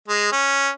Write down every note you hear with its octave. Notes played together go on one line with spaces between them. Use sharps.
G#3
C#4